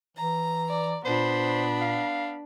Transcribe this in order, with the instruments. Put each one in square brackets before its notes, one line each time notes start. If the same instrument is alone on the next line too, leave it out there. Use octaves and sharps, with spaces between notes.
[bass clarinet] E3 [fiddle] A#5
[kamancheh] D5
[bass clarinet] A#2 [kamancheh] B3 B5 [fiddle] D4 [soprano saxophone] C5
[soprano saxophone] F5